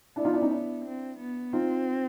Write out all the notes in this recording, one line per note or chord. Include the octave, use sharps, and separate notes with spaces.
B3 D4 E4
D#4 F4
D4 E4
C#4 D#4
D4 E4
C4
B3
C4 D#4 F4